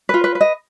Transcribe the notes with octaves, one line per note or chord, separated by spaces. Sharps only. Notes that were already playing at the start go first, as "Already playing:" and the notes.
F4 B4
B4
B4
D#5